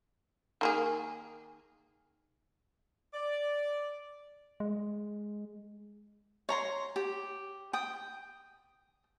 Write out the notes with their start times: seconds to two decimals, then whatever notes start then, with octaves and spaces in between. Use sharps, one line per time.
0.61 D#3 A#3 G#4
3.13 D5
4.60 G#3
6.49 C#5 A#5 C6
6.96 G4
7.73 G5 D#6